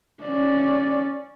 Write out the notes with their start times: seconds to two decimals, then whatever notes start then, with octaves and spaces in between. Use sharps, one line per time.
0.24 C#4 D5